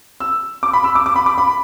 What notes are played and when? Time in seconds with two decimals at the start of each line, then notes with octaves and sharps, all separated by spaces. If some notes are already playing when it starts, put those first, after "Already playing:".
0.20 E6
0.63 D6
0.73 B5
0.84 E6
0.95 D6
1.06 D6
1.16 B5
1.26 D6
1.38 B5